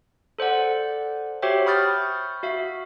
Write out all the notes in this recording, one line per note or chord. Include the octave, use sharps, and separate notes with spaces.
A4 C5 D5 F#5
F#4 G4 C5 C#5 E5 G5
B5 C#6 D#6 F6 G6 A6
F#4 E5 F5